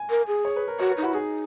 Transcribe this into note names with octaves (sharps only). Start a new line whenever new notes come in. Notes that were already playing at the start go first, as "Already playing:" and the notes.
Already playing: G#5
A#4
G#4
C#5
B4
A#4
F#4 C#5
B4
D#4
E4 F#4
D#4 G#4